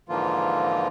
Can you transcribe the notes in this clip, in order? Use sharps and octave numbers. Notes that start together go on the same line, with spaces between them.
G#2 D3 E3 F3 A#3 F4